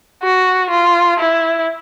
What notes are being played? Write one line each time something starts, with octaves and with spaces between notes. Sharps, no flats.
F#4
F4
E4